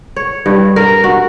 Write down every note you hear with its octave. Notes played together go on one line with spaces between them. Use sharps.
C#5
G2
A#4
F#4